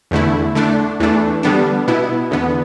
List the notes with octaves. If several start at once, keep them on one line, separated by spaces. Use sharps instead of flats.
E2 D3 A3 E4
D3 A3 D4
E2 E3 A3 D4
D3 G3 B3 D4
B2 B3 E4
E2 D3 B3